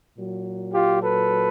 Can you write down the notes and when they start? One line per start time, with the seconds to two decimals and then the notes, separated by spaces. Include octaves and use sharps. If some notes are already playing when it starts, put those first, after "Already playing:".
0.17 A#2 F#3
0.74 F4 G4
1.03 A4 B4